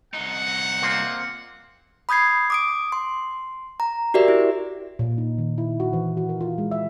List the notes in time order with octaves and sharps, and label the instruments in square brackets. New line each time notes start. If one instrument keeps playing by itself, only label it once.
[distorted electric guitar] C2 D#4 [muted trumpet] F#5
[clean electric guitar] A#3 C4 F4
[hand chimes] B5 D#6 G6 G#6 C7
D6 D#6 D7
C6
A#5
F#4 G4 A#4 D5 E5
E4
[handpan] A#2
D#4
D#3
E4
F#4
E3
F#4
A#4
F4
G#3
E5